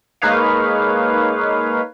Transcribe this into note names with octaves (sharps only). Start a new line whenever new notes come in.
G#3 A#3 D#4 B4 C#5 F5